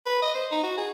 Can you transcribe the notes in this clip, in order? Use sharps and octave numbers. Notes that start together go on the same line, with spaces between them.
B4
D#5
C5
D#4
F#4
G#4